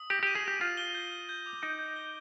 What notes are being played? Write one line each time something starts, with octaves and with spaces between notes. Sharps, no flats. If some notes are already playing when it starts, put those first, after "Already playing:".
Already playing: D#6
G4 A#6
G4 D#7
G#4
G4 A#6
F4 D#7
G7
G6
G7
G6
D6
D#4 D7
G6
G7